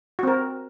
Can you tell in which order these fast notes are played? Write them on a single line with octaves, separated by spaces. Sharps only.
F#4 C4 A#4